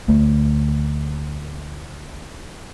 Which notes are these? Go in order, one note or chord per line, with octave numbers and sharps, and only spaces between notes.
D2 A3